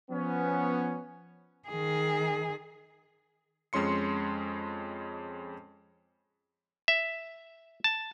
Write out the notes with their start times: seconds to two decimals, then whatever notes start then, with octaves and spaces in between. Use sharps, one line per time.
0.11 F3 B3 C#4
1.69 D#3 G#4
3.73 F2 G#3 C#4 C6 C#7
6.88 E5
7.84 A5